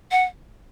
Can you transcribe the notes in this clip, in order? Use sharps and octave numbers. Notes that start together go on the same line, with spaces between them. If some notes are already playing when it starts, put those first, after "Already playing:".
F#5